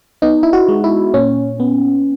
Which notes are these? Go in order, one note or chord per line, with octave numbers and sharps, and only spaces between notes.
B3 D#4
E4
F#4
G#3
E4
A#2 C#4
B3